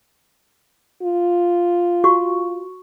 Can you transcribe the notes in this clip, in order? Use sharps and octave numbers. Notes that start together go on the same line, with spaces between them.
F4
F#4 C#6